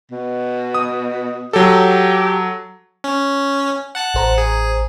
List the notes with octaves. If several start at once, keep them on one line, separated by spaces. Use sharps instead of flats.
B2
D#6
F#3 G4 A4
C#4
F#5 A5 F#6
A1 C5 A#5
G#4